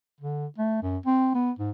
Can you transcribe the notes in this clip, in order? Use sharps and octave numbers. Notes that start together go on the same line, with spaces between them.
D3
A3
F#2
C4
B3
G#2